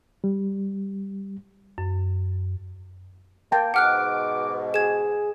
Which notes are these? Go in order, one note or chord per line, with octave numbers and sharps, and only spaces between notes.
G3
F#2
A#3 G5 A5
G#2 B2 F#5 D6 F6 F#6
G#4 G#6 E7